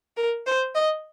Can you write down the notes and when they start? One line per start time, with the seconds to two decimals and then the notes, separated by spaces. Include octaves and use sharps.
0.17 A#4
0.46 C5
0.75 D#5